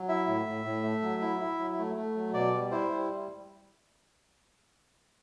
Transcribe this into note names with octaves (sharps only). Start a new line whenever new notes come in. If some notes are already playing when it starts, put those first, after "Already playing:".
Already playing: F#3
E4 E5
A2
A2
A2
A3
F#3
E4
E4
F#3
A3
A3
F#3
B2 D5
G3
E4 C5
G3